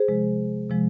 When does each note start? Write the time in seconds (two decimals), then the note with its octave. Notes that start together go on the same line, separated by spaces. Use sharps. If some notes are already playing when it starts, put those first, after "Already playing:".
Already playing: G#4 C5
0.08 C3 F3 G#3
0.69 C3 F3 G#3